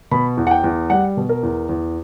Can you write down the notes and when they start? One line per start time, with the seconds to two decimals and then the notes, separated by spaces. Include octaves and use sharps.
0.11 B2 B5
0.37 E2
0.47 F#5
0.51 G5
0.64 E2
0.90 G3 F#5
1.17 B2
1.29 A#4
1.43 E2
1.69 E2